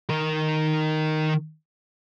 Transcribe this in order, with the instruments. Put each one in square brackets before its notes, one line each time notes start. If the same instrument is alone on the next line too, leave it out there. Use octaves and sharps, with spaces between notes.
[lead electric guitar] D#3 A#4